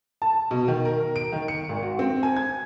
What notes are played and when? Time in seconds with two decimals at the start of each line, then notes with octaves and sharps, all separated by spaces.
0.22 A5
0.51 B2
0.68 D#3
0.85 A#4
1.16 D7
1.32 D#3
1.48 C#7
1.69 G#1
1.83 F#4
1.99 C4
2.23 G#5
2.37 G#6